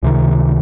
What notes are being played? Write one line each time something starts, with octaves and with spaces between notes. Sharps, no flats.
C#2 C3 D#3